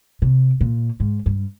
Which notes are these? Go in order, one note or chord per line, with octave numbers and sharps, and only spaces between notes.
C3
A#2
G#2
G2